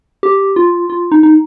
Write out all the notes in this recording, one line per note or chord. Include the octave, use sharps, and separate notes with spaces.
G4
F4
F4
D#4
D#4